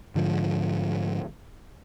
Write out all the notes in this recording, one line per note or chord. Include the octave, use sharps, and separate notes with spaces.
G#2 D3 F3